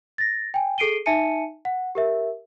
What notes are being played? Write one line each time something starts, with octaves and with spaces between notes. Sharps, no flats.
A6 A#6
G5 G#5
G#4 A4 C7 D7 D#7 G7
D#4 E5 G#5 A5 C#7 D#7
F#5
G4 A#4 E5